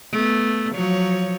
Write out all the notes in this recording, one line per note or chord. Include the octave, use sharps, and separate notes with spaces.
A3 B3
F3 F#3 C#5